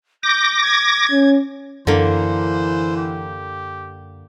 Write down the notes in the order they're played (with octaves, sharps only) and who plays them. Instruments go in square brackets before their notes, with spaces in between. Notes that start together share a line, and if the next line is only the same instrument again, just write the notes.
[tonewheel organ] D6 A#6 [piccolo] G6
[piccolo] G#6
[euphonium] C#4
[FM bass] F#2 [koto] D3 A#3 [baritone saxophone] E3 [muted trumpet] C5
[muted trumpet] G4